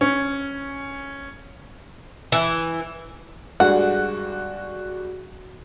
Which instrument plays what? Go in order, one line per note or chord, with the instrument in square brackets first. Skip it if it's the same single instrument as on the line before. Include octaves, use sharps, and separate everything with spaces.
[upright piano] C#4
[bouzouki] E3
[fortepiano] G2 G3 G#3 [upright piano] F#4 [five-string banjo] F#5